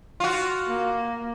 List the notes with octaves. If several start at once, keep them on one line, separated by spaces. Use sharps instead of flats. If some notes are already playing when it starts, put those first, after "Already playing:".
F4 F#4
A#3